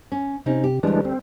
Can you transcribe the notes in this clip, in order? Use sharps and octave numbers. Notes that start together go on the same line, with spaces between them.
C#4
C3 C4 C#4 D#4
G4
D2 E3 G3 G#3 D4
C4